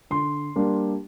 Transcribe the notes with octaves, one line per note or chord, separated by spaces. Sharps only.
D3 C6
G3 A#3 D4